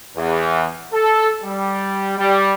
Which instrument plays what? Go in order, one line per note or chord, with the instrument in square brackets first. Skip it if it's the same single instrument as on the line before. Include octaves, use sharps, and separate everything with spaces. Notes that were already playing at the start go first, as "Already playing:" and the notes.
[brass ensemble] E2
A4
G3
G3